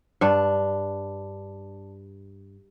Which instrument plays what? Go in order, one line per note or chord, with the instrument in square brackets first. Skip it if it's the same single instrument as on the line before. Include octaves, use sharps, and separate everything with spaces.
[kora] G2 D4